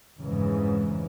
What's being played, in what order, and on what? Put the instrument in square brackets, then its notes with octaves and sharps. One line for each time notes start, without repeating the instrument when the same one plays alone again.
[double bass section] F1 G#2 C#3 E3